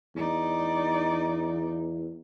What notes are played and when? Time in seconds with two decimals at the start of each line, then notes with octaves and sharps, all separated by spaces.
0.16 E2 D#4 D5